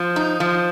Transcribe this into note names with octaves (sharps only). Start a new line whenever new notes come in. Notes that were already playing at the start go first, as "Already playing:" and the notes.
Already playing: F3
D#4
F3